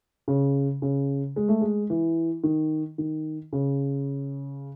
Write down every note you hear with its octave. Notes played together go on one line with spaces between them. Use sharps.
C#3
C#3
G#3
A3
G#3
E3
D#3
D#3
C#3